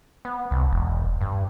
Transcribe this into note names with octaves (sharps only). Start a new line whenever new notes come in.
B3
C2
E1
G2